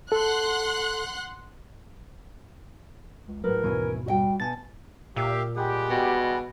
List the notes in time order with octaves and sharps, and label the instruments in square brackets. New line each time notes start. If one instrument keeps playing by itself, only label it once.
[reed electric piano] A4 [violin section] F#5 C6 F#6
[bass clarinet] C#2
[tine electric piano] A1 F#3 [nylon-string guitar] A2 B4 [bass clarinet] A#4
[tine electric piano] D#2 G#2 B2 [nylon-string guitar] E3 C#4
[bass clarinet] G3 [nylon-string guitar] F#4 D#5 G5
[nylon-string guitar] B2 [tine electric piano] G#5 A5 A6
[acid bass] A#2 [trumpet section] G4 [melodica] E5 F5
[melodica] G3 G#3 F#5 [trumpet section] G4
[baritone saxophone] B2